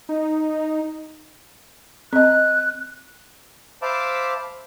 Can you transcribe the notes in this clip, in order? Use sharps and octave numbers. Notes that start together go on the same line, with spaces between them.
D#4
C4 D#5 F#6
C5 E5 F5 A5 B5 D6